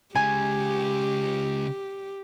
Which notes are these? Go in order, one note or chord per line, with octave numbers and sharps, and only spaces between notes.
C#3 G#3 G4 G#5